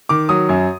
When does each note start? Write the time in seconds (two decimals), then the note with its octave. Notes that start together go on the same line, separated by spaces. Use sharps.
0.09 D#3 D6
0.29 F#3 D#6
0.49 F#2